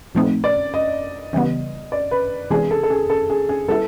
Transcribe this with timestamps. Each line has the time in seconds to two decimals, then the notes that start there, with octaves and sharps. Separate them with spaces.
0.15 A#2 F3 A3 C4 D#4
0.44 D5
0.74 D#5
1.33 C#3 E3 G3 B3
1.92 D5
2.11 B4
2.50 C3 E3 G#3 B3 D4 G#4
2.71 A4
2.83 A4
2.90 G#4
3.10 A4
3.30 G#4
3.49 G#4
3.68 G3 B3 E4 A4